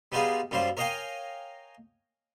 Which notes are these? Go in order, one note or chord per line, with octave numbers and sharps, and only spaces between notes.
G3 B3 D#4 F4 G#4
F#2 G3 F4 C5
A#4 C#5 D#5 F5 G5 G#5